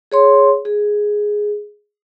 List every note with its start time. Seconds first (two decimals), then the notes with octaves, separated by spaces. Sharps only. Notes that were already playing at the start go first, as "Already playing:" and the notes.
0.12 G#4 C#5 C6
0.65 G#4